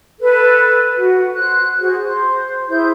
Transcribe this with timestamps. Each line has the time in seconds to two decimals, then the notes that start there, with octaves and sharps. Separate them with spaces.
0.19 A4 B4
0.96 F#4
1.35 C5 F#6
1.80 F#4 G#4 C5
2.01 C5
2.68 E4 G#4 C5 G6